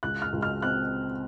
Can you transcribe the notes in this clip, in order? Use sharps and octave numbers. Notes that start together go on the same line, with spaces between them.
C#2 F#6
F6
C#2
F6
C4 F#6